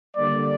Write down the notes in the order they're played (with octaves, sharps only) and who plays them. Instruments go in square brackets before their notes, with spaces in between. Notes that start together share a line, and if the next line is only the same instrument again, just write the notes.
[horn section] D3 G3 A#3 D5